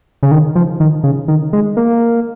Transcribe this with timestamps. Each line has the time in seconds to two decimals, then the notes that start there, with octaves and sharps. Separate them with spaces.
0.23 C#3
0.31 D#3
0.55 F3
0.80 D#3
1.03 C#3
1.28 D#3
1.53 G#3
1.77 A#3